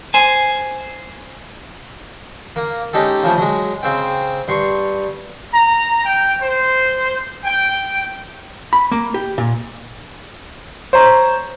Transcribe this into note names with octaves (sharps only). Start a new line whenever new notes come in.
C5 G#5
A#3
G#3 C#4 D#4 G4 A4
C#3 F3 A3
F#3 G#3
C#3 C4 G5
G2 C6 C#6
A#5
G5
C5
G5
B5
A#3
G4
A#2
C5 C#5 A#5